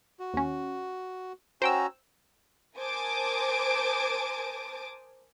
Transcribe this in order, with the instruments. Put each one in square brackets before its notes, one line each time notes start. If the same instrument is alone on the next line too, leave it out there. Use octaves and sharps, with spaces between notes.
[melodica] F#4
[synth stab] D#2 C#4
[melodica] C#4 F#4 A#5 [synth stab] C5 G5 E6
[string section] A#4 C5 G#5 A5 D6 D#6